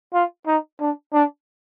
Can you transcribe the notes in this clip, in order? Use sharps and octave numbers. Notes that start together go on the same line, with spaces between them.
F4
D#4
D4
D4